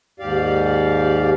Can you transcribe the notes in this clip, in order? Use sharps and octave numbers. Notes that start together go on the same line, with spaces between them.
D#2 G#2 G4 D5 F5